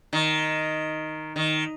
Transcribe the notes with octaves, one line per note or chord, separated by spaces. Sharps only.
D#3
D#3